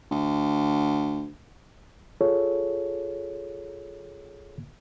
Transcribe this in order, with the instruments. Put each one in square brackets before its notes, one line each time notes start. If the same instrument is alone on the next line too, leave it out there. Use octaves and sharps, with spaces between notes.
[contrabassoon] D2
[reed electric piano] F4 G#4 A4 C#5